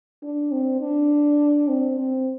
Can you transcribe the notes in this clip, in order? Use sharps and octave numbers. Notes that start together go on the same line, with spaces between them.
D4
C4
D4
C4
C4